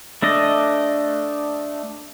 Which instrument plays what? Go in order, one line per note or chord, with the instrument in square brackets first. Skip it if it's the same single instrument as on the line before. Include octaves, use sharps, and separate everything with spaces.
[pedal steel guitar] A3 D4 D#5